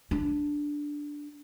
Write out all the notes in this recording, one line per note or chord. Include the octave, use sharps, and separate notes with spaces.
D4